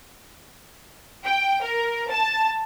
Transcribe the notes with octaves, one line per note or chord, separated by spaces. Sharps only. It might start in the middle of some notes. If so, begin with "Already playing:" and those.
G5
A#4
A5